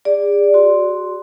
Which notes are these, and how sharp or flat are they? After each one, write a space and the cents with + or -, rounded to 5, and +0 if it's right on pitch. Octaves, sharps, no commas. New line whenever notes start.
G#4 -35 D5 +0
F#4 +0 C6 +0